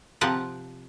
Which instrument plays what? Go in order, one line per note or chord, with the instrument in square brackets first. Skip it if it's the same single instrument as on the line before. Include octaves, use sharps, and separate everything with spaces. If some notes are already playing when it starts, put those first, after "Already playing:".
[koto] C3 F3 F4 A#4 F#5 A5